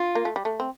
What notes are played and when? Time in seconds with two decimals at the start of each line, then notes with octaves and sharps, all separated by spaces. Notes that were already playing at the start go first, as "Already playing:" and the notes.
Already playing: F4
0.15 A#3
0.25 A3
0.36 G3
0.45 A3
0.60 C4